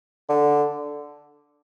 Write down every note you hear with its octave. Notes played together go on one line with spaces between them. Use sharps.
D3